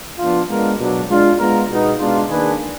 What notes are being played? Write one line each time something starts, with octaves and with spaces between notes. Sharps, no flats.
F3 B3 D4 F4
G#3 B3 D4 F4 A#4
B2 F#3 D4
G#3 D4 F4
G#3 B3 F4 A#4
B2 G#3 B3 D#4
B2 G#3 D4 F4
D#3 A#3 D4 G#4 B4